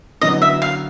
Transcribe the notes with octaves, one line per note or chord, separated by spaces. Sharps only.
F#2 D3 F#3 B3 E4 D#5
E5
F5